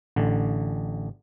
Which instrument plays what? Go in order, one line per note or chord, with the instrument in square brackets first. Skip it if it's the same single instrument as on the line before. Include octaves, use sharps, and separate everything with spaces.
[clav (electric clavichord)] A1 D3